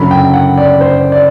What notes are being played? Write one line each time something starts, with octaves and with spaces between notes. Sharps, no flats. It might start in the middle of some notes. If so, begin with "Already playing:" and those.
Already playing: F#1 F#2 D3 F#3 B5
G5
F#5
D5
C5
D5